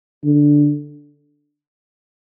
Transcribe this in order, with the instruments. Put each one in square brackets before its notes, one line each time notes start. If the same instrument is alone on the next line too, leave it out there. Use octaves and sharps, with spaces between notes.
[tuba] D3